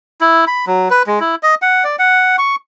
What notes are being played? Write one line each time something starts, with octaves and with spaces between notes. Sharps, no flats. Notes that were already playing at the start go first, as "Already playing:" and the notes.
E4
B5
F#3
B4
G#3
E4
D#5
F#5
D5
F#5
C#6